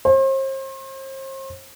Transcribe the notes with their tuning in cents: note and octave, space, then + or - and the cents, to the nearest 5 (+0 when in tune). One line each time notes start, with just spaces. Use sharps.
C5 +40